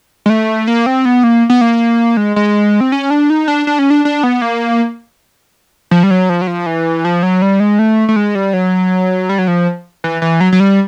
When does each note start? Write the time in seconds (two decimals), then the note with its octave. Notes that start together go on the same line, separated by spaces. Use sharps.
0.26 G#3
0.30 A3
0.68 A#3
0.86 C4
1.05 B3
1.24 A#3
1.50 B3
1.61 A#3
2.17 G#3
2.36 G#3
2.81 C4
2.92 C#4
3.10 D4
3.30 D#4
3.48 D4
3.67 D4
3.79 C#4
3.90 D4
4.05 D4
4.23 B3
4.42 A#3
5.91 F3
6.03 G3
6.11 F#3
6.29 F3
6.42 F#3
6.47 F3
6.66 E3
7.05 F3
7.23 F#3
7.42 G3
7.60 G#3
7.79 A3
8.09 A3
8.16 G#3
8.35 G3
8.53 F#3
9.29 G3
9.39 F#3
9.48 F3
10.04 E3
10.22 E3
10.41 F#3
10.52 F#3
10.60 G3